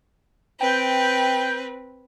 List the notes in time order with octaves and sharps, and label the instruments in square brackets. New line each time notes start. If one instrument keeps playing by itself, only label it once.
[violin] C4 B4 [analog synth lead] G5